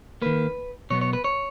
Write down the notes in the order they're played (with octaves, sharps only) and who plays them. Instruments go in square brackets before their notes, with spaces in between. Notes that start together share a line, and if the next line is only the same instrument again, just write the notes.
[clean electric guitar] D#3 A#3 B4
B2 F#3 B3 C#5
C#5
B4
C#5